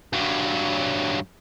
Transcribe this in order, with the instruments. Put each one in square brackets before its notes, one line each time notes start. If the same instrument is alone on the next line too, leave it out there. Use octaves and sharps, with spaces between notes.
[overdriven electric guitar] G2 F#3